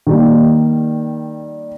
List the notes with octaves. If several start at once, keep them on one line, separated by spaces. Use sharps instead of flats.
D#3 G3 A#3